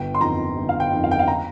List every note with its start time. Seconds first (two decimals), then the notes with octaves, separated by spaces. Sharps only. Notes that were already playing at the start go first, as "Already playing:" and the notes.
Already playing: G1 G5
0.15 C6
0.21 F2 D#3 A#5
0.57 G1
0.69 F5
0.80 G5
0.92 F2 D#3
1.04 F5
1.11 G5
1.19 F5
1.28 A#5